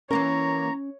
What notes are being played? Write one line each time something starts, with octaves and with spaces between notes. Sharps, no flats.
E3 A#3 C#4 A#4 C#5 A#5